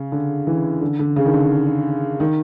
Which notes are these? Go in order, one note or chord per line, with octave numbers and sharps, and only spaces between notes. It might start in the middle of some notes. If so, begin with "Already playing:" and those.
Already playing: C#3
D3
E3
D3
D3
C#3
D#3
D3
D#3